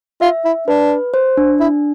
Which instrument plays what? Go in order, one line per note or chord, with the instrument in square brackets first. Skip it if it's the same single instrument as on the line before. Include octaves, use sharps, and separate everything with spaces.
[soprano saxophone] F4 [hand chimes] E5
[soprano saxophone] E4
[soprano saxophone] D4 [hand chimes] B4
[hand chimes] C5
D4
[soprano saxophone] E4